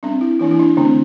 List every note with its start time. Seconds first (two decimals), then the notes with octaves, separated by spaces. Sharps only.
0.03 G3 C4 D4
0.21 E4
0.40 E3 A#3 D4 E4
0.51 E4
0.59 D4
0.77 D3 A3 C4 D4